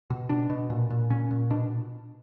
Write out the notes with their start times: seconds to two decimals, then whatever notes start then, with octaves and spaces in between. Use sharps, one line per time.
0.10 B2
0.29 B2 D4
0.50 B2
0.70 A#2
0.90 A#2
1.10 A#2 C#4
1.31 A#2
1.50 B2 D4